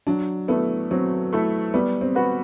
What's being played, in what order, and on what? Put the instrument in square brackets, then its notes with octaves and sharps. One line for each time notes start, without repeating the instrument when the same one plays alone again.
[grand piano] F#3 [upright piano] D4
[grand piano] A3 E4 A4 [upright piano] B3
[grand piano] F#3 [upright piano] C4
[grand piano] A3 E4 A4
[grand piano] G3 [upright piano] B3
[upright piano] C4
[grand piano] B3 F#4 B4